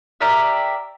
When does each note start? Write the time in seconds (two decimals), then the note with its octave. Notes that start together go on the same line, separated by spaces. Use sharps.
0.21 G4 A#4 D5 E5